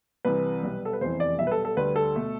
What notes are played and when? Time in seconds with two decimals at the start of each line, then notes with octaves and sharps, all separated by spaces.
0.25 C2 C3 E3 B4
0.63 B1 B2 G3
0.85 A4
0.93 B4
1.00 F1 E2 C3 E3 C5
1.20 D5
1.39 B1 B2 G3 E5
1.47 B4
1.51 A4
1.65 A4
1.77 D2 D3 G3 B4
1.96 A4
2.15 B2 A3